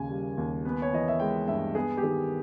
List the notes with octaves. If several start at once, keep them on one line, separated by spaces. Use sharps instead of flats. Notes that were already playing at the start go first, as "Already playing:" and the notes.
Already playing: D#2 C#3 G#5
G3
D#2
B3 B4
C#5
E3 D#5
E5
G#3 G5
G2 E5
B3 G#4
G4
D#3 G#4